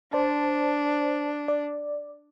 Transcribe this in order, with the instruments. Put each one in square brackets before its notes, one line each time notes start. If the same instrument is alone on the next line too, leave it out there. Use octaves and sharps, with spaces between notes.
[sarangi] D4 [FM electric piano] C5 D5 A5
[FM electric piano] D5